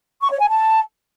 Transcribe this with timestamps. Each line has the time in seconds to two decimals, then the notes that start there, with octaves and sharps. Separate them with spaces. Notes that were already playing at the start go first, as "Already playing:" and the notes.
0.21 C#6
0.30 C#5
0.40 G#5
0.49 A5